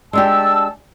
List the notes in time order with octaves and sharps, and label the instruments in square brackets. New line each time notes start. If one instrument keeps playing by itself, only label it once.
[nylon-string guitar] G#3 D4 G4 [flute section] A5 E6